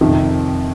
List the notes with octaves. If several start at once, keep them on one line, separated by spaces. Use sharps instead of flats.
F2 C3 D#3